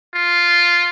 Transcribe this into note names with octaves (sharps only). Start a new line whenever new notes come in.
F4